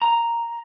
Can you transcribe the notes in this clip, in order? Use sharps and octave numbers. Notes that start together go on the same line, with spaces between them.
A#5